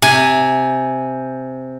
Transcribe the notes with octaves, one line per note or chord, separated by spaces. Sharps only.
C3 G#5